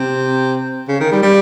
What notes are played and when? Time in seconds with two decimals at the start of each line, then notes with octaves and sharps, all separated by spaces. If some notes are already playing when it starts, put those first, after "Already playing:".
Already playing: C3
0.88 C#3
1.00 D#3
1.12 G3
1.23 G3